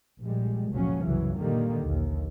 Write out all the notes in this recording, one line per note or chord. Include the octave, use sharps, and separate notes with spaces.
A#1 G3 G#3
F1 C#2 A#2 F3 F#3 C#4
F#1 C2 F#2 C#3 E3 F#3
A#2 D3 D#3 G3 A#3
A#1 D#2